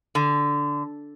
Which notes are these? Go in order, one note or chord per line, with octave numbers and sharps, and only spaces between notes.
D3